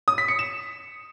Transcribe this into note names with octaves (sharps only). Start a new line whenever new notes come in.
D#6
B6
C#7
E7